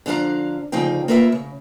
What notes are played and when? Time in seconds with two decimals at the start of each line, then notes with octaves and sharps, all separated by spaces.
0.06 D3 F3 D4 F5 A#5
0.72 D2 C#3 F3 D#4 F5 G5
1.08 A#3 F4 A#4 B4 D#5 E5
1.32 C#3